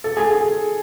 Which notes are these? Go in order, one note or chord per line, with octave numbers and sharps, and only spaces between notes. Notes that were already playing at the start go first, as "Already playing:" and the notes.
A4
G#4
G#4